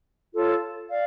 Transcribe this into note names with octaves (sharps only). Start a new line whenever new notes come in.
F4 A4 C#5
D5 F5